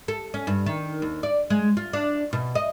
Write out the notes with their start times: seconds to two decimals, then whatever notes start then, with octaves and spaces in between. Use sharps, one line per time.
0.08 A4
0.34 C#4
0.47 G2
0.66 D#3
1.02 D#2
1.23 D5
1.50 G#3
1.77 F4
1.93 D4
2.33 B2
2.55 D#5